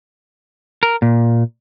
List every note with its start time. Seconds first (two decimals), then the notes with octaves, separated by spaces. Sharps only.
0.83 A#4
1.02 A#2